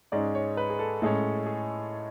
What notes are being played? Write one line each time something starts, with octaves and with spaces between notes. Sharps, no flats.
G#2 G#3 C#4 D5
C#5
B4
G#4
A4
A2 G#3 C#4
G#4